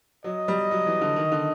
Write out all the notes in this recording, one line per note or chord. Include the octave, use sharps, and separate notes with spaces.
F#3 D#5
G3
F#3
E3
D3
D#3
D3